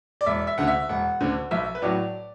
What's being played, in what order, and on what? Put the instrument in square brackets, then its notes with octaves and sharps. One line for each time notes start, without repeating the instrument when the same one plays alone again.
[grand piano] D5
E1 E5
E5
D2 D3 F#5
E5
E1 F#5
D2 D3
B1 E5
B4
A2 F#3 D5